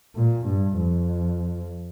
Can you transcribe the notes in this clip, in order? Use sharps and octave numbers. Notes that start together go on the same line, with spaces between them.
A#2
G2
F2